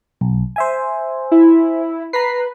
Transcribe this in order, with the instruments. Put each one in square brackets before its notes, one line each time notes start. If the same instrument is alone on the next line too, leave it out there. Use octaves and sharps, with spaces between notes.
[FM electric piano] B1
C5 E5 G#5
[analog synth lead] E4
[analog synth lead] B4 [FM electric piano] A#5 B6 C7